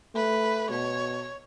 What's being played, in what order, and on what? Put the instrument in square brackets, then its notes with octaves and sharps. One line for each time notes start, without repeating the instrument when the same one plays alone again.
[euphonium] A3 [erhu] B4
[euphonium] B2 [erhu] C#5